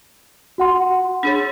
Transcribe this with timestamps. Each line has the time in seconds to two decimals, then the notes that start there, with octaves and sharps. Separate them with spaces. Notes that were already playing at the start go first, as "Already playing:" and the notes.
0.58 F#4 F#5 C6
1.23 D4 G#4 C#5